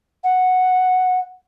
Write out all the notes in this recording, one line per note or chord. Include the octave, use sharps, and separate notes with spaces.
F#5